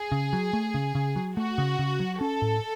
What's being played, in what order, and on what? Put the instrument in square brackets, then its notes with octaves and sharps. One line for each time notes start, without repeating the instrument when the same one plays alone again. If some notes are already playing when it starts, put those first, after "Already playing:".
Already playing: [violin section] G#4
[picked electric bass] C#3
F#3
A3
C#3
C#3
F#3
[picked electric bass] A3 [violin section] F#4
[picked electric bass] C#3
C#3
F#3
[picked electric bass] C#4 [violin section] A4
[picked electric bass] A2